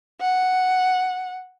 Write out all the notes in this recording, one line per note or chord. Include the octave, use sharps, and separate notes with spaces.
F#5